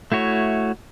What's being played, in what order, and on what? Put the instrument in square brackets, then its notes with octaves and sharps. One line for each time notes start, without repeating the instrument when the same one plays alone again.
[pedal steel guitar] A3 E4 F#4 C#5